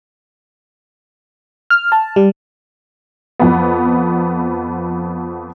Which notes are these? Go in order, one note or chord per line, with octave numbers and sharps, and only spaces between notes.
F6
A5
G3
F2 B3